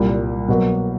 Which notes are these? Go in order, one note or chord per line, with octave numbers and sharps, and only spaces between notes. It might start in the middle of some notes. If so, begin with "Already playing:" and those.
Already playing: C2 A#2 G3
B2 F#3 A#3